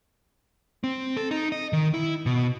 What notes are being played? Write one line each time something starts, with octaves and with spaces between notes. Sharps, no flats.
C4
A4
D#4
D#5
D#3
E4
B2